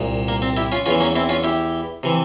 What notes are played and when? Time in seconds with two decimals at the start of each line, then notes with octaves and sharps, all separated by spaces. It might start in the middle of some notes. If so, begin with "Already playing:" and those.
Already playing: C2 A#2
0.28 A#3
0.42 C4
0.57 E4 G4
0.72 C#4 F4
0.86 E2 E3 C#4 F4
1.00 A#3 C#4
1.16 C4 E4
1.29 C#4 F4
1.44 E4 G4
2.03 C3 E3